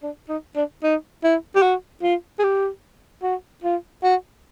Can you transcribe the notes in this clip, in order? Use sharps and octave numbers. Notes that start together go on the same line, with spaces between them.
D4
D#4
D4
D#4
E4
G4
F#4
F4
G#4
G4
F#4
F4
F#4